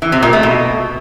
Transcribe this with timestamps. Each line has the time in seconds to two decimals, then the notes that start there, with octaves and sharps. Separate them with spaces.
0.02 E3
0.12 C3
0.23 A#2
0.33 A3
0.43 B2